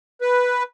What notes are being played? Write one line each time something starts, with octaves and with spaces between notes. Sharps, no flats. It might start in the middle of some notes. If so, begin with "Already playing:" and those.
B4